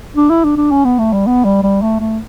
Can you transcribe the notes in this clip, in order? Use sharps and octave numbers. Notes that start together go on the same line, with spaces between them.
D4
E4
D4
D4
C#4
B3
A3
G3
B3
G3
G3
A3
A3